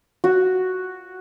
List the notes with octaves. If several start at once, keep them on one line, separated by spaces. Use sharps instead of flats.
F#4